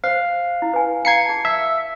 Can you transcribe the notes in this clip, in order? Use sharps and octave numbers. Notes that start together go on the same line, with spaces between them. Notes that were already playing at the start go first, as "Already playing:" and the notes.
C5 F5
E4
B4 G#5
F5 A#5 G#6 C7 C#7
G#4 A5
E5